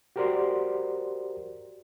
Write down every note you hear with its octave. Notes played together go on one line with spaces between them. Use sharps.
F#4 G4 A#4 C5 D5 C6